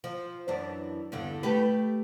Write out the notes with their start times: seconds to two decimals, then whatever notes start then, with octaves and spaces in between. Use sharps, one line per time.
0.04 F3
0.48 F#2 E3 D4
1.12 E2 G2 D3
1.43 A3 G4 B4